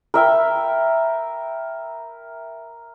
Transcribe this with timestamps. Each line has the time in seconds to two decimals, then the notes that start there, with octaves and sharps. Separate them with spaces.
0.14 A#4 E5 G5 B5